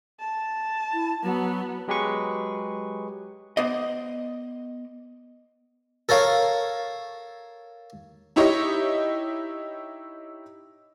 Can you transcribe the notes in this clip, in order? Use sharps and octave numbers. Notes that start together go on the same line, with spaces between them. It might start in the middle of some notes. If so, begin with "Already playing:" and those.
A5
E4
F#3 B3
F#3 G#3 G4 G#4 B4 C#6
B3 C5 D5 D#5
A4 A#4 C#5 F5
D#4 E4 G4 C#5 D#5